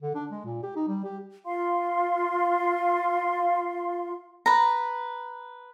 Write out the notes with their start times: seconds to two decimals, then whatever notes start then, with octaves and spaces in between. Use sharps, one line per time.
0.02 D3
0.15 D4
0.31 G#3
0.45 A#2
0.63 G4
0.76 D#4
0.88 G3
1.04 G4
1.45 F4 F5 C6
4.46 B4 A#5